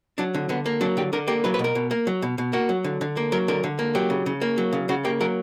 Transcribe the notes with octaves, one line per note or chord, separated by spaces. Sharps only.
F#3 D4
D3
D3 B3
A#3
F#3 D4
D3 G4
D3 A#4
A#3 G4
F#3 B4
B4
B2
A#4
B2
A#3
F#3
B2
B2
A#3 F#4
F#3
D3
D3
A#3
F#3 A#4
D3 A#4
D3
A#3
F#3 G4
C#3
C#3
A#3
F#3
C#3
C#3 F#4
A#3 G4
F#3 A#4